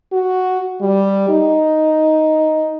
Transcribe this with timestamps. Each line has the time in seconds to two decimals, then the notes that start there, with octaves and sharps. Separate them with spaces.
0.12 F#4
0.81 G3
1.29 D#4